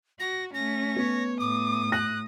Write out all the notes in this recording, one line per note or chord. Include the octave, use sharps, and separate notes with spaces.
F#4 A#6
A3 C#4 A#6
B3 C#5
A2 D6 D#6
F#6 A#6